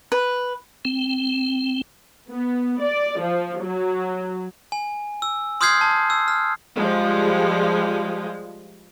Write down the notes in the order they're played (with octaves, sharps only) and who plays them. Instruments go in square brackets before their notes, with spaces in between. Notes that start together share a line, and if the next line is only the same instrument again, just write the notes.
[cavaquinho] B4
[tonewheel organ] C4
[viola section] B3
D5
F3
F#3
[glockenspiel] G#5
E6
C6 D#6 F6 G6 G#6 C7
A5
E6
F6
[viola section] F3 G3 G#3